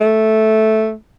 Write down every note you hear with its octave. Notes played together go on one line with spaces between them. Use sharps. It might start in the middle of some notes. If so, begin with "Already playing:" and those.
A3